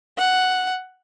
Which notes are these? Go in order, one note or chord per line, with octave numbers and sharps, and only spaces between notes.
F#5